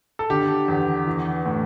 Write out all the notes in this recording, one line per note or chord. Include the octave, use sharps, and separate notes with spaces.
A4
D3 G4
E2
E3
A2